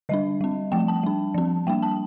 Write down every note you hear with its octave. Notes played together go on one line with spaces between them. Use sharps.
D3 G3 D4 D#5
G3 C4
F3 A3 C4 G5
A5
G3 D4
F3 C4
G3 A#3 D4 G5
A5